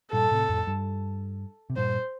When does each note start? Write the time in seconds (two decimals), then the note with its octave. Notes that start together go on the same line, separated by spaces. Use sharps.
0.13 G2 A#2 A4
0.31 A2 C3
0.49 F2 A2
0.67 G2
1.70 C3
1.77 G2 A#2 C5